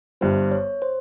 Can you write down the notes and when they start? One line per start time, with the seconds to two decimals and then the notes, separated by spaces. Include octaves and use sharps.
0.21 G1 G2 G3 C5
0.52 C#5
0.82 C5